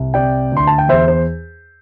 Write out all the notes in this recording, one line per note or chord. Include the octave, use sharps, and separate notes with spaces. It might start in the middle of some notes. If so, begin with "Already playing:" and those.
Already playing: C2
C3 D5 G5
D2 C6
A5
G5
E2 C5 E5
C5